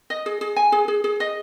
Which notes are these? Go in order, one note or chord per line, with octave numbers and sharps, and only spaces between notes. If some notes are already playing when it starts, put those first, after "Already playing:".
D#5
G#4
G#4
G#5
G#4
G#4
G#4
D#5